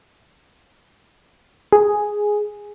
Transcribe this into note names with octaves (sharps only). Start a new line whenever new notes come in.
G#4